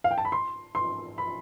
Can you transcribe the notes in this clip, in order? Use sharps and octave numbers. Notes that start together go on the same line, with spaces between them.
F5
G5
A5
B5
C6
C6
B5